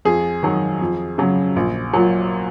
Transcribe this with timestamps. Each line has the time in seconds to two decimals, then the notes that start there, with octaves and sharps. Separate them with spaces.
0.05 F2 G#4
0.43 D#3 F#3
0.81 F2
1.18 C#3 F#3
1.56 A#1
1.94 A#2 F#3